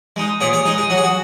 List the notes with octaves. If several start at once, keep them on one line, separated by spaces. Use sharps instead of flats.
G#3 D#4
A#2 G#4 C#5
G#4 C#5
G#3 D#4 G#4
G#4
F#3 F#4
G#4
F#4